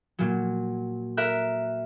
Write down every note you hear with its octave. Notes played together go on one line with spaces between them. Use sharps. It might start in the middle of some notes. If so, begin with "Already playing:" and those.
A#2 F#3
A#4 E5 F#6